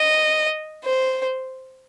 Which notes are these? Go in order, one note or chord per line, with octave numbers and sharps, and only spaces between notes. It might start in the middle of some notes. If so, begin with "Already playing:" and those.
Already playing: D#5
C5